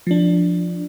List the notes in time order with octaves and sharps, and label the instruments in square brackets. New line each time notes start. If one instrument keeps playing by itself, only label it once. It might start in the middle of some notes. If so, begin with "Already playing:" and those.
[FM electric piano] F3 D4